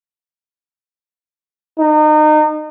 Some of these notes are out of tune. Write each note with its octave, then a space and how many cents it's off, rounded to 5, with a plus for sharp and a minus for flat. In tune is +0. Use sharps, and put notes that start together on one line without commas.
D#4 -30